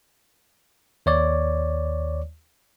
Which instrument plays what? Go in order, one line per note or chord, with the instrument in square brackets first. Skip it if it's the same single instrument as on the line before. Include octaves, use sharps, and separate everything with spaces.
[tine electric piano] D#2 C#5 D5